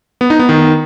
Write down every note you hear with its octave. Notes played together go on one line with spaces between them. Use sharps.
B3
D#4
B3
D#3